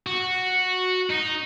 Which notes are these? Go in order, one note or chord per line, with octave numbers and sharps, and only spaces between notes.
F#4
D#4